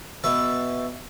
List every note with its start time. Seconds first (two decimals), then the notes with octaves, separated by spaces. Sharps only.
0.24 B2 B4 E5 A5